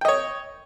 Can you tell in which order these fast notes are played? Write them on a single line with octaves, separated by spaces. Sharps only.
G5 D#5 C#5